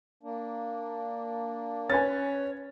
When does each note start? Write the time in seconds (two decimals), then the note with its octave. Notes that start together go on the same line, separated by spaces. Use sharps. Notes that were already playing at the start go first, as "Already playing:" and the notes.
0.23 A#3 D4
1.90 C#4 B4 C#5 G#5 A6